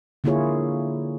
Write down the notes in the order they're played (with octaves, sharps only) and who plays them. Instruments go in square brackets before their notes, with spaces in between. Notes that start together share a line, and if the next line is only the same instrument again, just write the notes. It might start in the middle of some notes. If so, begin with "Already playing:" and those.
[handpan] D3 A#3 E4 F4 G#4 C#5